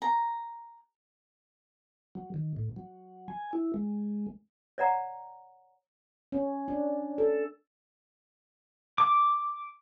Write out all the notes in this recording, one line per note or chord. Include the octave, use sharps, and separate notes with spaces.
A#5
F#3
D#3
A2
F#3
G#5
E4
G#3
C#5 D5 F#5 A#5
C#4
D4
A4
D6